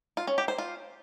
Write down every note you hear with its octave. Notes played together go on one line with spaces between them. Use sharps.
F4
C#4
G4
C5
F4